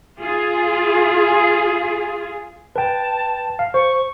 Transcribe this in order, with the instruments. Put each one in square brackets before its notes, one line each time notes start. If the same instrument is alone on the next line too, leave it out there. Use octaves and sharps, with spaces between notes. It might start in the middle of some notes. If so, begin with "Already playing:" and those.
[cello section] F4 G#4
[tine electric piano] B4 G5 [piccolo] A5
[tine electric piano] F5
[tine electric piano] C5 [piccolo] C#6